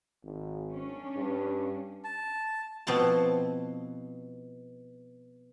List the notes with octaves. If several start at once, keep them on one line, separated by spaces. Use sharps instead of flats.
G#1
C#4 D4
G2
A5
B2 F3 B3 C4 E4 A5